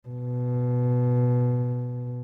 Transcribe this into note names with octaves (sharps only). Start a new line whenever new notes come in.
B2